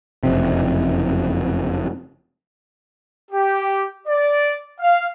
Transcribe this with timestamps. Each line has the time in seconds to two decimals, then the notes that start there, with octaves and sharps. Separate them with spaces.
0.23 F#1 F2 C3
3.32 G4
4.08 D5
4.80 F5